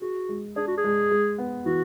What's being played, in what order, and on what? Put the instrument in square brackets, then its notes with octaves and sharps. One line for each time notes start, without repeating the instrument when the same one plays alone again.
[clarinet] F#4 [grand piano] G#4
[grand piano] G#3
[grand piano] D4 [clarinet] G#4
[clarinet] F#4
G#4
[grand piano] G#3
G#3
B3
[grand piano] E3 [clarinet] F#4